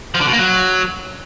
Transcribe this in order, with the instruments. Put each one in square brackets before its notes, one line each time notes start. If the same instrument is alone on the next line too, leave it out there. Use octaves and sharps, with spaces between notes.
[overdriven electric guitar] F3
D3
B2
A#3
F#3